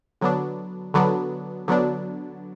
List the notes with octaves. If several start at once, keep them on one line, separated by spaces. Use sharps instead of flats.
D3 F#3 B3 D4
D3 F#3 B3 D4
D3 F#3 B3 D4